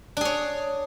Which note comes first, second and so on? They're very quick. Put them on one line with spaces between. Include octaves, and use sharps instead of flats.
D4 G#4 C#5